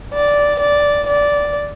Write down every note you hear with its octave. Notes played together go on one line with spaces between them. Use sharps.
D5
D5
D5